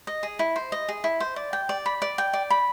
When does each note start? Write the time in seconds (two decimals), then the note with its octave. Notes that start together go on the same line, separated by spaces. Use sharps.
0.07 D#5
0.23 G#4
0.39 E4
0.56 C5
0.72 D#5
0.89 G#4
1.04 E4
1.20 C5
1.36 D5
1.53 G5
1.69 D5
1.86 B5
2.02 D5
2.18 G5
2.33 D5
2.50 B5